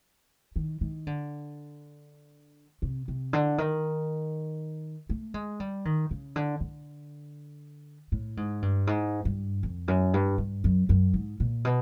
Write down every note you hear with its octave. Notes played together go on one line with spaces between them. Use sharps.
D#3
D#3
D3
C3
C3
D3
D#3
A3
G#3
G3
D#3
C#3
D3
D3
A2
G#2
G2
G#2
G2
F2
F#2
G2
G2
F#2
F#2
G#2
A#2
B2